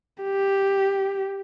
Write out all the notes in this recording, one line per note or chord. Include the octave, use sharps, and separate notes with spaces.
G4